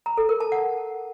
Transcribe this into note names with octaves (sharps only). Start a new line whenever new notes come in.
A#5
A4
A#4
A5
F#5